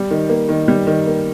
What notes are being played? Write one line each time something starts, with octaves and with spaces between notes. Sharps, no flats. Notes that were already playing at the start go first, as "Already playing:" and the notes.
Already playing: G3
D#3
A#3
D#3
G3
D#3
A#3